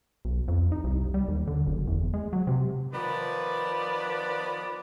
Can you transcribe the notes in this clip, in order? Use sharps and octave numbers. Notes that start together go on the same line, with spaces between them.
B1
F2
D#4
C2
G3
D#2
D3
F#1
E2
G#3
F#3
C3
D#3 F3 B3 B4 D5